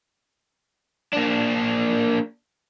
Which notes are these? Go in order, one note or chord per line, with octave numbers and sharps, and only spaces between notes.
A#3 D4